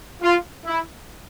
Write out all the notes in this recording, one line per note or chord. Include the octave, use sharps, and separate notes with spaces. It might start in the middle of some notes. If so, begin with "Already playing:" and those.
F4
E4